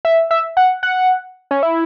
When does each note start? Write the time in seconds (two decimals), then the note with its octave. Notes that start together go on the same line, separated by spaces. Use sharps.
0.05 E5
0.31 E5
0.57 F#5
0.83 F#5
1.51 C#4
1.63 E4